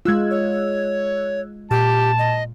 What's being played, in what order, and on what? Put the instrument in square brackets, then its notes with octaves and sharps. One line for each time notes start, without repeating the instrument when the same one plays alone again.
[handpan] G#3 F4 [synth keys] E6 F#6 G#6
[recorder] C#5
[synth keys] A#2 [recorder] G4 [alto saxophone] A5
[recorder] D#5